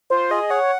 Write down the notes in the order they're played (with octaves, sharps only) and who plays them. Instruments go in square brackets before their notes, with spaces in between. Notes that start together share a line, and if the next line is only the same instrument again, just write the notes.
[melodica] F4 [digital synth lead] C5
[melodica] G#4 [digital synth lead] D#5
[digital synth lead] C#5 [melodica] F#5